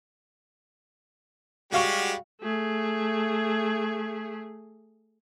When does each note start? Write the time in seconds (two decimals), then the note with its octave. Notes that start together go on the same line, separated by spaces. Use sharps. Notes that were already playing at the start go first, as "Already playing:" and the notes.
1.73 G3 G#3 F#4 G4 F5 C#6
2.41 A3 G#4